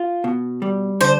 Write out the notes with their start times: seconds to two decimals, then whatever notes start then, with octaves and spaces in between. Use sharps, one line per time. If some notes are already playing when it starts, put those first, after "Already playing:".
Already playing: F4
0.24 B2
0.62 G3
1.01 D3 C5